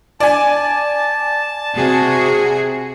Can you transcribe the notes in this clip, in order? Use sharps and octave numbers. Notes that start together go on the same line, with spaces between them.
D5 G#5 A5
C3 F#4 G#4